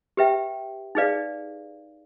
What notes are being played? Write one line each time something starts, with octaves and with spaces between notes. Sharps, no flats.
G4 B4 E5 G5
D#4 G#4 B4 D5 F5